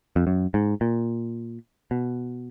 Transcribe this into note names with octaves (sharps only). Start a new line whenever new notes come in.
F2
F#2
G#2
A#2
B2